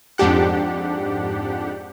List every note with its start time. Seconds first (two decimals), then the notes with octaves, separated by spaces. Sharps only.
0.18 F2 G#2 D4 G4 F#5